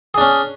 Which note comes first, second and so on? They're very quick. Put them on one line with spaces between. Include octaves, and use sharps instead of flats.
G#4 D4 C#4